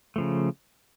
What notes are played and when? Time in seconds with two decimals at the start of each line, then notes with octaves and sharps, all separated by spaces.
0.16 C#3 F3 A3